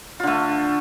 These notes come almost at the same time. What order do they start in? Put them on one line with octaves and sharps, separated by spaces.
F4 D3 A3